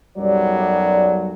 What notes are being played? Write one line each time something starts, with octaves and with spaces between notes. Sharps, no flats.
B1 F#2 F#3 G3 D5